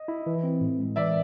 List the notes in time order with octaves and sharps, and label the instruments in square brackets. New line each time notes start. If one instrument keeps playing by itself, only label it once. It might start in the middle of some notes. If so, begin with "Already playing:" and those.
Already playing: [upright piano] D#5
[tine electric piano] E4
E3
C4
A2
G#3
[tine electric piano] E3 [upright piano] D5 E5